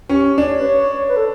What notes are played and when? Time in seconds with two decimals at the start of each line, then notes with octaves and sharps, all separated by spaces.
0.09 C#4 G4
0.38 D4 C#5
0.60 B4
0.66 C#5
1.08 B4
1.16 A4